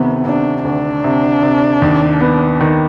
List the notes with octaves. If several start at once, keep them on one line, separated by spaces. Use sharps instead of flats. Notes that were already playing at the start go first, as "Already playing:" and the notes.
Already playing: D2 C3 D#3 B3
C3 D4
D2 D4
C3
C3
D#2
B3
D#3